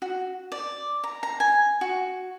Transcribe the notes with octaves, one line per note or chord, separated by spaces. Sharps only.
F#4
D5
A#5
A#5
G#5
F#4